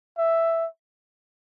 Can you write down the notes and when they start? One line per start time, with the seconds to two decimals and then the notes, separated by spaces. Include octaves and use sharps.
0.18 E5